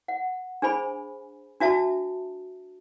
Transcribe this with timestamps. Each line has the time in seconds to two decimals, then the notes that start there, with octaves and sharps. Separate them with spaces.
0.08 F#5
0.62 D4 G#4 C5 G#5 B5
1.60 D4 F#4 E5 A5